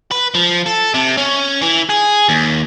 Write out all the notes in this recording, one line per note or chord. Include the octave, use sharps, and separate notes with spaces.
B4
F3
A4
C3
C#4
E3
G#4
D#2